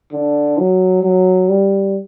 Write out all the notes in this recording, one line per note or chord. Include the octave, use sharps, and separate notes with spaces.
D3
F#3
F#3
G3